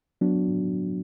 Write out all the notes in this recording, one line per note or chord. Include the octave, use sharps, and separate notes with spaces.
F#3 B3 D4 F#4